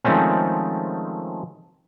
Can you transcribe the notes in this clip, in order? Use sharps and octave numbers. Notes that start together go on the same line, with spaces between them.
D#3 F3 G#3 A3 C4 C#4